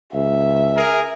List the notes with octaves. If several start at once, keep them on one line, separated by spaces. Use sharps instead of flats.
C#2 E5
G#4 A#4